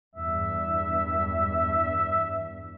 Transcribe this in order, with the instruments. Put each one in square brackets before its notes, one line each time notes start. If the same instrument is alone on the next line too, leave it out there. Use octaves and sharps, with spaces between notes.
[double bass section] E2 G2 [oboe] E5